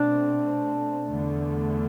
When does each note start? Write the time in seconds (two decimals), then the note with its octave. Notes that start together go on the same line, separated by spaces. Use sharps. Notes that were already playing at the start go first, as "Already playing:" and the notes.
Already playing: B2 A3 C4 D4
1.06 E2 D3 A3